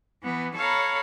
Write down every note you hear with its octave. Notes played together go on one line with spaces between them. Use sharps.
E3 B3
A4 C#5 F5 A#5 B5